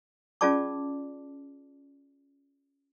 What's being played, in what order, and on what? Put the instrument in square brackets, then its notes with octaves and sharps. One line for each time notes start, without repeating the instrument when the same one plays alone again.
[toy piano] C#4 F4 G#4 D5 A5 D6